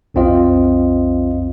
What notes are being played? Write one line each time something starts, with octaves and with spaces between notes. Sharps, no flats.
B1 F2 C4 F4 D#5